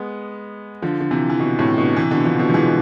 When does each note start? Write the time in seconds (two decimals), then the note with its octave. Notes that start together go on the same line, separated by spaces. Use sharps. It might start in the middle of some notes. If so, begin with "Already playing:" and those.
Already playing: G#3 B3
0.82 D3 F3
1.00 D3
1.11 C3 E3
1.29 E3
1.39 B2 D3
1.59 A2 C3
1.78 B2 D3
1.96 C3 E3
2.11 B2 D3
2.25 D3 F3
2.39 B2 D3
2.50 F3
2.54 E3 G#3